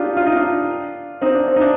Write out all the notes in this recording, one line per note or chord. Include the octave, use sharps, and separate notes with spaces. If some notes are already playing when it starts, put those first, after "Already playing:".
Already playing: D4 D#4 F4 G4
F4
D#4
D4 F4
C4 D#4
D4
C4
D#4
D4